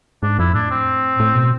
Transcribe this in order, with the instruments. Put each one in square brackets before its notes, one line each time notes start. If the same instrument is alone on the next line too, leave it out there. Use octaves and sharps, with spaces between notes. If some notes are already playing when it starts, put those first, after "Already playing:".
[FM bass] G#2 [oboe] D4
[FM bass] F2 [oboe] E4
[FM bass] A2 [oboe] D4
[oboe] C4
[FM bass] A2
B2